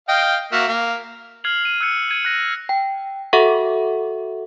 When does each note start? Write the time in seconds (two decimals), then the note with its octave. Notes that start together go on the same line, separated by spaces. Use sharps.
0.08 D#5 F5 G5
0.52 A#3 F#4 E5
0.68 A#3
1.44 F6 G#6 C7 F7 F#7
1.65 D#7
1.81 E6 F#6 G#6 C#7
2.10 G#6 D#7
2.25 F#6 A#6
2.69 G5
3.33 F#4 A4 E5 F#5 C#6